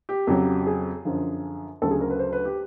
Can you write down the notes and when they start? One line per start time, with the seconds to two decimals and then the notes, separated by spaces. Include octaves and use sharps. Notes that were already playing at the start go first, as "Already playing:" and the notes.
0.09 G4
0.27 F2 C#3 F#3
0.67 G#4
1.05 F#2 D3 F3
1.82 D2 C#3 F#3 A4
1.91 G#4
2.01 A#4
2.10 B4
2.19 C5
2.33 B4
2.45 G4